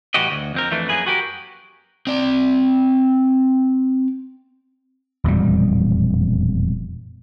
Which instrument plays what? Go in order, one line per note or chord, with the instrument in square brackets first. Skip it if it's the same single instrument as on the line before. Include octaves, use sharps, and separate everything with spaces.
[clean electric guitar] A2 E3 G3 F#4 G4 D#5
D2
F2 C4 A#4
F2 E3 A3 D4
F#2 A#3 G#4 B4
F#4 G4 A#4
[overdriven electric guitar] C4 D5
[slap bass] E1 F2 A#2 G3